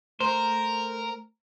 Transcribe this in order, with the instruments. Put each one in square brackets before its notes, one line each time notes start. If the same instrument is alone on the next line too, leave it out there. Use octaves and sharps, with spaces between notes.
[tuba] A3 [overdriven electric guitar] A#4 [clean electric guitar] C5